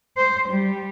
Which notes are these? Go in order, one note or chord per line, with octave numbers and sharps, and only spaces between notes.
C5
G3